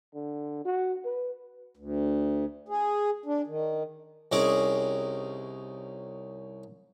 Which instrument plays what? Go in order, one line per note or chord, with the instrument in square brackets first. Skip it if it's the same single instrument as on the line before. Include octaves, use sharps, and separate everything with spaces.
[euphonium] D3
F#4
B4
[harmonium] D2
G#4
D4
D#3
[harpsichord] C2 C#4 D#4 G#4 D6